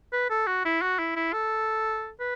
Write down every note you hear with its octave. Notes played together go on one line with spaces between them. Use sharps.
B4
A4
F#4
E4
F#4
E4
E4
A4
B4